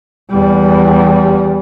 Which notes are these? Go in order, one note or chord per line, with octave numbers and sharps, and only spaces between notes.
E2 G3